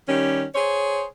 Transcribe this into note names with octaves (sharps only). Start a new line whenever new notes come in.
D#3 G3 C#4 G4
G#4 C5 C#5